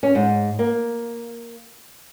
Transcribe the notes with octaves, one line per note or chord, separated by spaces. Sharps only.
C#4
G#2
A#3